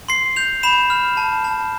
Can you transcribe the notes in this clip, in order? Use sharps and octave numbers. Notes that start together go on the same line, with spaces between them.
C6 C7
G6 F7
B5 E7
F6
A5
A5